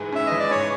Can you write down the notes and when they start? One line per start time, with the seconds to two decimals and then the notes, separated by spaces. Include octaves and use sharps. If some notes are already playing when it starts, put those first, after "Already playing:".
Already playing: G#2 E3 G#3
0.12 C#4 E5
0.27 E3 D#5
0.39 D5
0.51 G#2 C#5